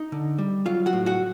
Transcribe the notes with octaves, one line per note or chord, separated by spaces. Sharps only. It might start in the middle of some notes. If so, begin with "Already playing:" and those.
Already playing: D#4 D#5
D3
G3
F#3 F4 F5
F#4 F#5
A2
F#4 F#5